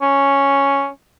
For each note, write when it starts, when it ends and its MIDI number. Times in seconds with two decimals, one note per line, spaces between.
0.02 0.88 61